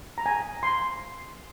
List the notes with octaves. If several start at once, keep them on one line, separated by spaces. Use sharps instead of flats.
A#5
G#5
C6